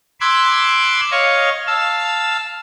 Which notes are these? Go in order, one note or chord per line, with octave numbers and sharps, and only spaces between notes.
B5 C6 D6 E6 F#6 G#6
C#5 D#5 F5 C#6
F5 A5 E6